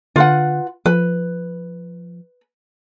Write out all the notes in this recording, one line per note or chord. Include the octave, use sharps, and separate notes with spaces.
D3 F4 B4 F#5
F3 B4